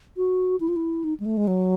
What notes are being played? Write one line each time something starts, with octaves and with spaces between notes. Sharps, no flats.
F#4
E4
F4
E4
D#4
G#3
A3
G#3
F#3